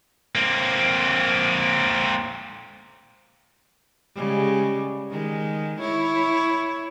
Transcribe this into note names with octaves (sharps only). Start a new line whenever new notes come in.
A#3 C4
C#3 G3 G#3
D#3 G#3
E4 C#5